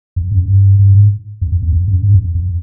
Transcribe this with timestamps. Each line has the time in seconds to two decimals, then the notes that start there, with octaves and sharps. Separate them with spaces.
0.16 F2
0.32 F#2
0.48 G2
0.79 G2
0.94 G#2
1.41 F2
1.52 F2
1.62 E2
1.73 F2
1.88 F#2
2.03 G2
2.14 F2
2.35 F2